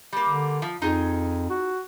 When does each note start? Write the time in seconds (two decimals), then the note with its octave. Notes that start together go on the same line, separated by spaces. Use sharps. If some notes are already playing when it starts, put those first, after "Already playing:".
0.12 G3 A#3
0.28 D3
0.62 F3
0.82 F2 D#4 F4 G#4
1.50 F#4